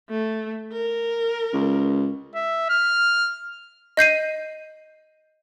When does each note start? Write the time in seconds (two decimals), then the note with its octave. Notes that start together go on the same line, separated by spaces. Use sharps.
0.10 A3
0.73 A#4
1.53 C#2
2.35 E5
2.70 F6
3.97 D#5 G6 C7 D#7